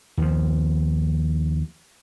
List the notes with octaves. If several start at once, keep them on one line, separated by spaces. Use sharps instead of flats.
D#2 F3